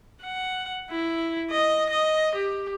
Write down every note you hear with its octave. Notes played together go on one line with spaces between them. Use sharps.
F#5
E4
D#5
D#5
G4